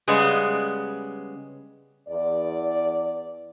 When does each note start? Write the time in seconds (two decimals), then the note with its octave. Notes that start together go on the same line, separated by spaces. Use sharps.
0.08 C#3 G3 G#3 B3
2.09 E2 D5